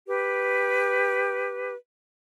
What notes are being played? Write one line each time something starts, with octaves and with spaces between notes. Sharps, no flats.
G4 B4